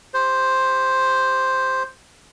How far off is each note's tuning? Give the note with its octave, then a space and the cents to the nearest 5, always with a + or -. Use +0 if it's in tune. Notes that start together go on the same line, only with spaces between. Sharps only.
G4 +0 C5 +0